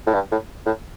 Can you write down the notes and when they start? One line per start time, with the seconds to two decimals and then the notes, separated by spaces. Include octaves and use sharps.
0.07 A2
0.14 G2
0.32 A2
0.66 A2